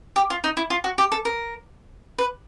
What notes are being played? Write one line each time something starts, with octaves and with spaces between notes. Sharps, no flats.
G4
F4
D#4
E4
F4
F#4
G4
A4
A#4
B4